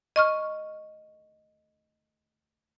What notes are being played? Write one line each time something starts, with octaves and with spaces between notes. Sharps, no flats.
D#5 C#6 F6